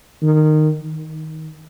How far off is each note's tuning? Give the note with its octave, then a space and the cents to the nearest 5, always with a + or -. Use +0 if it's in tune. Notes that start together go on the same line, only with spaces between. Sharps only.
D#3 -15
D#3 +15